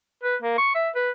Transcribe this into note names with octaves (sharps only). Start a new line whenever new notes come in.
B4
A#3
C#6
E5
B4